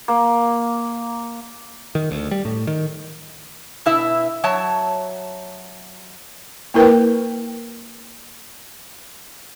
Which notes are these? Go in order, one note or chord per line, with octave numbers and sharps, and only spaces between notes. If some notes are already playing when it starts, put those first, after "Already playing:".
A#3
D#3
D2
G3
A2
D#3
B2 E4 E5
F#3 C#5 E5 A5
A#3 E4 A#4 B4 G5